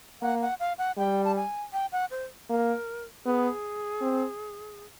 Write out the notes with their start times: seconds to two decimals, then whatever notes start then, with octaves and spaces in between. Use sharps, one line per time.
0.22 A#3 F#5
0.41 F#5
0.60 F5
0.78 F#5
0.98 G3 G5
1.24 A5
1.36 G#5
1.73 G5
1.92 F#5
2.11 C5
2.50 A#3 A#4
3.25 B3 G#4
4.01 C4